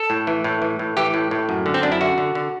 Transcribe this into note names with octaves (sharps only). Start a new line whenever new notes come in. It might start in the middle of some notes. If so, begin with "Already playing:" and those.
Already playing: A4
A2
E3
A2
E3
A2
E3 G4
A2
A2
F#2
D3
C4
F#2 D4
E4
D3 F#4
D3
D3